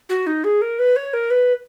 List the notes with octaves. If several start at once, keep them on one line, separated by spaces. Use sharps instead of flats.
F#4
D#4
G#4
A#4
B4
C#5
A#4
B4